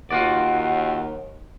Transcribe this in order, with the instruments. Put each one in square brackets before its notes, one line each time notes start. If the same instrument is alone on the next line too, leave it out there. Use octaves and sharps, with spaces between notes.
[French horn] D#2 [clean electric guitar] F4 F#4 D5 [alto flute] F#5